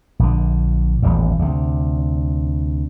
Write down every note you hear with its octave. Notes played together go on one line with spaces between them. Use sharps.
A#1 D3
D#1 A1 E2
D2 C3